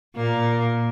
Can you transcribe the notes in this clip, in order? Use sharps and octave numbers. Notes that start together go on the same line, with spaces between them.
A#2 A#3